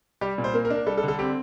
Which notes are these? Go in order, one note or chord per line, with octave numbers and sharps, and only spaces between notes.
G3 G4
A#2
C5
A#3 A#4
A#4
D4
A#4
G3 A4
A4
D3
A4
C4 G4